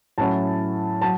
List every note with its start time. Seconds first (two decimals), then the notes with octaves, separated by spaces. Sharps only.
0.18 A2 F#3 C#4 E4 A5
1.02 F#3 A5